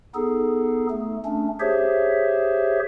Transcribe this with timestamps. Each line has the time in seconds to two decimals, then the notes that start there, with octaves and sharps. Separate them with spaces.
0.15 B3 D#4 G#4 A4
0.90 A3
1.25 A3 C#4 D4
1.60 G4 G#4 C5 C#5 E5